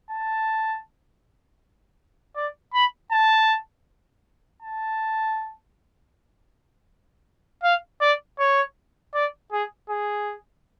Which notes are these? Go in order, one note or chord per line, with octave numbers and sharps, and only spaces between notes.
A5
D5
B5
A5
A5
F5
D5
C#5
D5
G#4
G#4